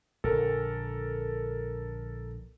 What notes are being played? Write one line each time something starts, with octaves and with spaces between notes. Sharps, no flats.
A#1 D3 A4 A#4